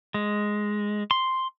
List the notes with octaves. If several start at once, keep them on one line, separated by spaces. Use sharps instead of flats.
G#3
C6